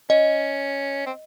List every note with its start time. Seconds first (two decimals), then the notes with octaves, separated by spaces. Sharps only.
0.10 C#4 D#5
1.06 C4